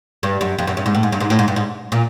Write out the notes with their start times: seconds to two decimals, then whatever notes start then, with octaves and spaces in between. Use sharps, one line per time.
0.23 G2
0.41 F#2
0.59 F2
0.67 F#2
0.77 G2
0.86 G#2
0.95 A2
1.03 G#2
1.12 G2
1.20 G#2
1.30 A2
1.39 G#2
1.48 G2
1.56 G#2
1.92 A#2